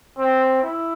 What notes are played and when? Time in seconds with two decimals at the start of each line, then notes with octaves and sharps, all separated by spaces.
0.18 C4
0.62 E4